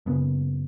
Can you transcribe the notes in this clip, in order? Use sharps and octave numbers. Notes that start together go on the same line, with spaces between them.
F#2 C#3 B3